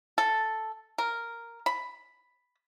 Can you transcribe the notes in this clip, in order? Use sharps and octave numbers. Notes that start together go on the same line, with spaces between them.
A4
A#4
B5